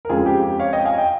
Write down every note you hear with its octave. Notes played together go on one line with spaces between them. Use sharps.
A#4
F2 C#3 G#3 F4 G#4
G4
G4
C#5 F5
D#5 G5
F5 G#5
D#5 G5